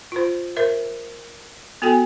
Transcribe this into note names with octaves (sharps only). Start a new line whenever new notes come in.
F4 C5
A#4 C5 E5
B3 F#4 A4 G5 G#5